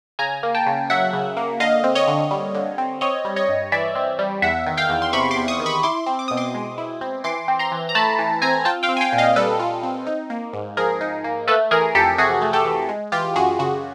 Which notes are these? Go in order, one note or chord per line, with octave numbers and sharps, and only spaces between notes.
C#3 G#5 A#5
A#3
G5 A5
C#3
F#3 E5 F#5
C#3
A#3
D3 D#5 F5
C4
C#5 D#5
D3
G3
D3
C4
C4 C#5 D#5
G3
C#5 D#5
G2
E3 D5 E5
C4
G3
E2 E5 F#5
D#3
F5 G5
E2
C6
C3 B5 C#6
C6 D6
E2
C#6 D#6
D#3
B5 C#6
E4 C6 D6
C4
D6
B2 D#6
C6 D6
G#3
E4
C4
E3 C6 D6
C4
A#5 C6
E3
A#5
A3 A5 B5
E3
C4 G#5 A#5
F4 G5 A5
F5 G5
C4
G#5
F5 G5
A#2
D#5 F5
G3 A4 B4
F4
C4
D#4
A#3
G#2
F3 G#4 A#4
D#4
A#3
A3 A4 B4
E3 G#4 A#4
F2 G4 A4
C3 F#4 G#4
A3
G4 A4
E3
G#3
E3 F4 G4
F#2 F#4 G#4
C#3 F#4